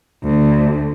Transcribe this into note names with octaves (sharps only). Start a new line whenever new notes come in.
D2